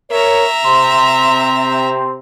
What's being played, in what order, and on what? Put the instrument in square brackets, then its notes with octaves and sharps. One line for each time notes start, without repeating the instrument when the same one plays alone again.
[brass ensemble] A#4 C#5 [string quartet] E5 A#5
[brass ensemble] C3 C4 [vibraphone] C6